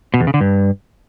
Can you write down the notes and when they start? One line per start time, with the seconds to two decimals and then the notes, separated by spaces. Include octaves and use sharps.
0.14 B2
0.20 E2
0.27 C#3
0.34 D3
0.41 G2